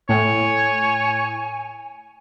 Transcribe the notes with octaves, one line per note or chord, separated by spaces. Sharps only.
A2 C#5 G#5